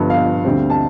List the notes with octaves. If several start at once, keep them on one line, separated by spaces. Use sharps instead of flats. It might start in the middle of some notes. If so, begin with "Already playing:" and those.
Already playing: G1 G2 F3 B3
F5
D2 D3 G3 C4
A5